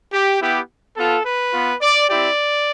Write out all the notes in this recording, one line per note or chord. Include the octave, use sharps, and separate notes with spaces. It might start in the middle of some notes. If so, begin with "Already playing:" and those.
G4
B3 E4 G4
B3 F4 A4
B4
B3 F4
D5
C4 E4 G4 D5